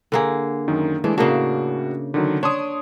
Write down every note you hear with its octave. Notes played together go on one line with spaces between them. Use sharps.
D3 A#3 G#4
F#2 D#3
E3 G#3 A3 D4
A2 C#3 A#3 C#4 D4 F#4
D3 D#3 F#3
D4 C#5 C6 D#6